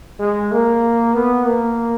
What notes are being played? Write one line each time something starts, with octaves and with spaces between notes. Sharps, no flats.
G#3
A#3
B3
A#3